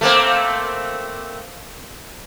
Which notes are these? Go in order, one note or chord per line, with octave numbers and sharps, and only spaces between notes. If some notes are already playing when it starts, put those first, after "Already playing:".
A3 A#3 C4